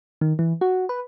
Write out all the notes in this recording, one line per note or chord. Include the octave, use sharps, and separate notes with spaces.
D#3
E3
F#4
B4